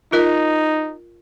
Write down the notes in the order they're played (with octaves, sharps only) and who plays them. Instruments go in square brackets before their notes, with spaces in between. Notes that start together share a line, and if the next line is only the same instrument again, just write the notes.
[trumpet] D#4 [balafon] F4 A#4 D#5